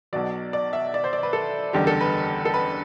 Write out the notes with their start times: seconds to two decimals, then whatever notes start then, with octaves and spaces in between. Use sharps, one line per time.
0.13 B1 B2 F#3 D5
0.53 D5
0.73 E5
0.94 D5
1.04 C5
1.13 D5
1.23 B4
1.33 A4
1.73 F#1 E2 D3 G3 G4
1.87 A4
2.01 B4
2.45 A4
2.54 B4